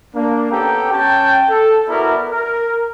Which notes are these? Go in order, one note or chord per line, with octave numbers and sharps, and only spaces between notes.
A#3 D4
B3 C#4 G4 A4 G5 A#5
C#4 G5 A5
A4
B3 E4 F#4 A#4 D5 A#5
A#4